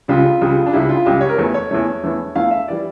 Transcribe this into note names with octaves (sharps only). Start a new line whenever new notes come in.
C#2 C#3 G3 F4
C#2 C#3 G3
D4
C#2 C#3 G3 E4
F4
C#2 C#3 G3 G4
C#5
A#4
E2 E3 A3 A4
C#5
E2 E3 A3
E2 E3 A3
E2 E3 A3 F5
E5
E3 G3 D5